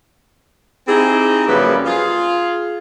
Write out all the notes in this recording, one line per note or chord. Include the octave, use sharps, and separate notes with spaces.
C4 D#4 E4 G4 G#4
F#2 C#3 F3 G3 A#3 B4
F4 G#4